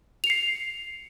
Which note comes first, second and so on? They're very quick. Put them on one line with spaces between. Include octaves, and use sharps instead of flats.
F7 C#7 C7